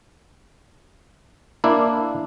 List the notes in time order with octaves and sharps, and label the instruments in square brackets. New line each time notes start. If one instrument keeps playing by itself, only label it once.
[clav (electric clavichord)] A#3 D4 E4